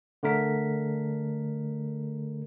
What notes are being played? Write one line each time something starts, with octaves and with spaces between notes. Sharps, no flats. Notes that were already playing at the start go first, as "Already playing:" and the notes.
D3 A3 A#4 B6